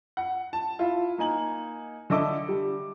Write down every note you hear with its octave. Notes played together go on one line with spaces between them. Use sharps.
F#5
A5
E4 F4
A#3 D#4 G#5 F#7
D3 A4 D#5 E5 D6 E6
G3